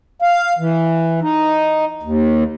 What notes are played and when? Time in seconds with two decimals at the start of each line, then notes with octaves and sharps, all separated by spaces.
0.22 F5
0.59 E3
1.22 D#4
2.03 D#2